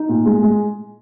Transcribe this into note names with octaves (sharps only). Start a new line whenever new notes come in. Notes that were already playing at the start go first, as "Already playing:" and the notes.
Already playing: D#4
A#2
G#3
G#3